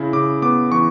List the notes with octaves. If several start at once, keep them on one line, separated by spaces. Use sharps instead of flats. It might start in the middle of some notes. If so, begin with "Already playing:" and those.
Already playing: C#3 E4
C#3 D6
B3 D6
E3 C#6